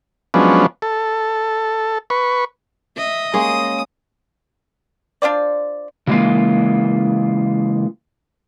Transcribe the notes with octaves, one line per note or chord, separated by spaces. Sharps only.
F3 F#3 G#3 B3 C#4 D4
A4
B4 C#6
D#5 E5
G#3 A#3 C#4 D#6
D4 F4 C5 D5
C#3 E3 G#3 A#3 F4